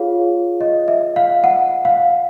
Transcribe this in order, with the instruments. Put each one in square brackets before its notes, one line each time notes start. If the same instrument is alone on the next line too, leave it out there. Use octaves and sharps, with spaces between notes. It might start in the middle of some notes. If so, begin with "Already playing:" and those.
Already playing: [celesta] F4 G#4 C#5 F5
D#5
E5
F5
F#5
F5